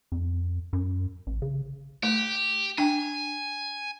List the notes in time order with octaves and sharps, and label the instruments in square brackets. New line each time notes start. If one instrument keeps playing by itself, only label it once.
[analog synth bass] F2
F#2
A1
C#3
[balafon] A3 [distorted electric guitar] G4
[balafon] D4 G5 [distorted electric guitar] G#5